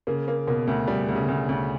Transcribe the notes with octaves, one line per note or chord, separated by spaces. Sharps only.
C#3 A#3
A#3
B2 A#3
D2
B2 G3
D2
C#3
D2
D2